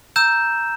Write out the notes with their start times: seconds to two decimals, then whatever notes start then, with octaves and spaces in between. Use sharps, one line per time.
0.16 A#5 E6 G6 E7